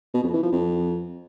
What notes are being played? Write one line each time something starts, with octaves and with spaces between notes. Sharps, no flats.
B2
F2
E3
F3
F2